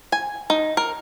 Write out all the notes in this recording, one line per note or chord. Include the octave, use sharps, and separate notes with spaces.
G#5
D#4
A#4